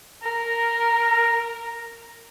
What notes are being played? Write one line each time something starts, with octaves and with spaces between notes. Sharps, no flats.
A#4 A#5